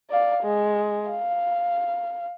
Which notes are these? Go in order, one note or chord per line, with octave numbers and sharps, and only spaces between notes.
D5 F5
G#3
F5